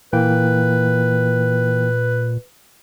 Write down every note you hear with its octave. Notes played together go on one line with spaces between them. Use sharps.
A#2 E3 A#3 B4 G5